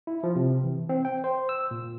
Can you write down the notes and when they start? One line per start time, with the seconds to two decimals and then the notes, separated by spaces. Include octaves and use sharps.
0.07 E4
0.23 F3
0.36 C3
0.64 E3
0.89 C4
1.05 G5
1.24 C5
1.49 E6
1.71 A#2